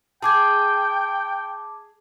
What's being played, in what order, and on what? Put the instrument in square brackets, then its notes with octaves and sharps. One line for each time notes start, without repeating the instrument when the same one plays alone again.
[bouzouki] G#4 [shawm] G5 [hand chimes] A5 D6 G#6